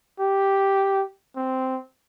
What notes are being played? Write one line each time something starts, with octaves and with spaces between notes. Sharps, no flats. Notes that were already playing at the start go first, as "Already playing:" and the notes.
G4
C4